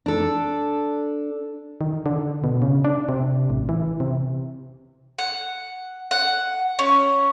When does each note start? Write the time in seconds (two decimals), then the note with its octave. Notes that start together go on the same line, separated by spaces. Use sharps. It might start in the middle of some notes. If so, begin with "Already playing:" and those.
0.06 D4 A4
1.81 D#3
2.06 D3
2.44 B2
2.62 C#3
2.84 D4
3.09 C3
3.50 A1
3.69 E3
4.00 C3
5.18 F#5
6.11 F#5
6.79 C#4